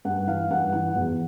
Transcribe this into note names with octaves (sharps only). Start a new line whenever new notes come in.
G2 F#5
E3 F5
G2 F#5
E3 F#5
E2